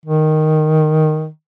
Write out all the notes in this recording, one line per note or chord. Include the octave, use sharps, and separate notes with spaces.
D#3